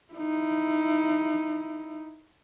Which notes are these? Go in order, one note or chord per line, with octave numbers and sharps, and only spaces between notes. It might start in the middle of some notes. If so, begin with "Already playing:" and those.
D#4 E4